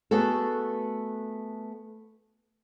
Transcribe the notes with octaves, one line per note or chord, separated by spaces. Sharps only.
A3 B3 F#4 G#4 A4